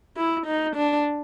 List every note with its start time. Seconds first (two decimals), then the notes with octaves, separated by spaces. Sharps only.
0.17 E4
0.46 D#4
0.76 D4